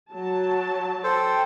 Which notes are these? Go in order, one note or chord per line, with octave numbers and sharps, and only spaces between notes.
F#3 A5
A4 C5 G5